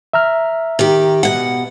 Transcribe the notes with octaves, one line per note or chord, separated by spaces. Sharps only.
E5 A#5 F6
D#3 G4
B2 F#5